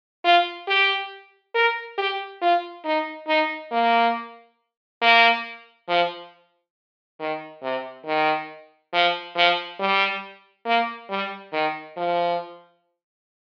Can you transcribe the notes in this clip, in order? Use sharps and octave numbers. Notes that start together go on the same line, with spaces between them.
F4
G4
A#4
G4
F4
D#4
D#4
A#3
A#3
F3
D#3
C3
D#3
F3
F3
G3
A#3
G3
D#3
F3